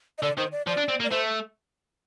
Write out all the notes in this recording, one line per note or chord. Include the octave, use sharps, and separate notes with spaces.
D#5
D3 D5
D#3 C5
D5
F3 D5
D4
C4
A#3
D5
A3 C5